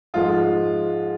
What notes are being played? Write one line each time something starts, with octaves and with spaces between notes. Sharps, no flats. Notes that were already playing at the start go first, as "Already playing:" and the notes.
G#2 F3 G#3 F4